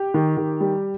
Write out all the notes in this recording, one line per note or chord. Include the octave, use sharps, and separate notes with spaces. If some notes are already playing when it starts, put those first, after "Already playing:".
Already playing: G4
D#3
D#3
G3